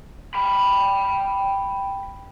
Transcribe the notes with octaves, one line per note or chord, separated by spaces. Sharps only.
G5 B5